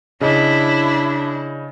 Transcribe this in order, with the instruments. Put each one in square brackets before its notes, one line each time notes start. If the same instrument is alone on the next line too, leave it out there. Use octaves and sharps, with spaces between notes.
[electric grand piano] C#3 D#5 [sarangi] D4 [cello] E4